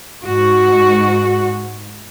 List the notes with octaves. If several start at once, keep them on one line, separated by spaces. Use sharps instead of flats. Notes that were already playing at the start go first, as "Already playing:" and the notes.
G#2 F#4